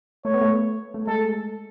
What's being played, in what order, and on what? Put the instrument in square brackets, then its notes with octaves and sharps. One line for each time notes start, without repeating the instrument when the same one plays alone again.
[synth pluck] A3 [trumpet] C#5
[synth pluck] B3
A3
A3
[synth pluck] G#3 [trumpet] A4